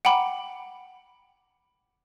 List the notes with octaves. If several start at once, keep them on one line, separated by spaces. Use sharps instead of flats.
F#5 G5 A#5 B5 D6